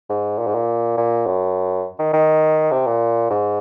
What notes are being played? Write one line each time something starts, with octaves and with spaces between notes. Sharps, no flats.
G#2
A#2
G#2
A#2
A#2
F#2
D#3
D#3
C3
A#2
G#2